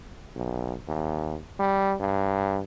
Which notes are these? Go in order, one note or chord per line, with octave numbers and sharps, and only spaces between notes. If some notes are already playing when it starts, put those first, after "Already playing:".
B1
D#2
G3
G2